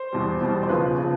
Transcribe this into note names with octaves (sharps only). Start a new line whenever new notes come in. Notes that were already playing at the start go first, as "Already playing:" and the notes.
Already playing: C5
E2 B2 G3
E2 B2 G3
C5
D#2 C#3 F3 B4
C#3 F3